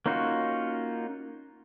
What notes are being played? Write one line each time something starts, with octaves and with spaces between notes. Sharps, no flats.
A#3 C#4 D#4 F4 F#4